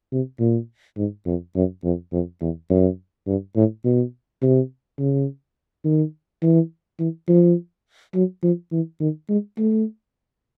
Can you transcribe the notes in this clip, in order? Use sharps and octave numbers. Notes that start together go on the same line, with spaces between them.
C3
A#2
G#2
F2
F#2
F2
F2
E2
F#2
G2
A2
B2
C3
C#3
D#3
E3
E3
F3
F#3
F3
E3
D#3
G#3
A3